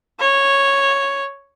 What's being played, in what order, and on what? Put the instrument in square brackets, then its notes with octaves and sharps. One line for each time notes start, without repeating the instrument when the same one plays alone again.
[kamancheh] C#5